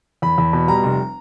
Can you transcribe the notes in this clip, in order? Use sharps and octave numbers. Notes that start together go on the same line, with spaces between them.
E2 B5
E2
B2
G3 A#5
F1